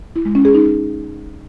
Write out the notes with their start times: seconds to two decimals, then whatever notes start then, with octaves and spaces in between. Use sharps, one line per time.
0.16 E4
0.25 G#3
0.35 C#4
0.45 G#4
0.55 D#4